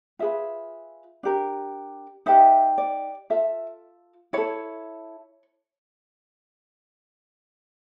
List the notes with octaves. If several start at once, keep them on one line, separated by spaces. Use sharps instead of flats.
F4 G#4 B4 E5
D4 G4 A#4
D#4 G4 B4 E5
D5
F4 A4 E5
E4 A4 C#5